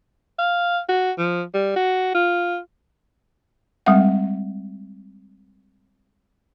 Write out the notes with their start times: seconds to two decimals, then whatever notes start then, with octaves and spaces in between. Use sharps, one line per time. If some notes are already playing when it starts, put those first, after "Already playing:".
0.39 F5
0.89 F#4
1.18 F3
1.54 G3
1.76 F#4
2.15 F4
3.86 G3 G#3 C4 E5 F#5